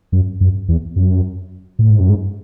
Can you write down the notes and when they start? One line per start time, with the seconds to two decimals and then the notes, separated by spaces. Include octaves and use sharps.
0.12 F#2
0.41 F#2
0.68 E2
0.96 F#2
1.79 A2
1.90 G#2
2.00 F#2
2.09 G#2